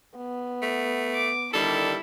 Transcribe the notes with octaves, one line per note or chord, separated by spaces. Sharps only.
B3
A3
D6
D3 D#3 G3 E4 A4